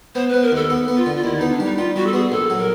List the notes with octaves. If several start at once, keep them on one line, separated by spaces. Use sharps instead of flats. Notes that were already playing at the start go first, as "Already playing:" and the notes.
B3 C5
B4
B3
A#4
D#2 A4
B3
B3
F4
D3
F4
D#2 E4
B3 D#4
D4
G3 D#4
G3 F4
G3 F#4
A4
B3 G#4
A#1 A4
F#3
A#4